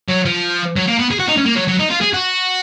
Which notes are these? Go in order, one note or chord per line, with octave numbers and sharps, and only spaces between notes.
F#3
F3
F#3
A#3
B3
G#4
F#4
D#4
C#4
A#3
F#3
F#3
D#4
F4
G#4
F#4